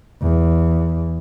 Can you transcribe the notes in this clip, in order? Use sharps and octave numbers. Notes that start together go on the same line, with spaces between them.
E2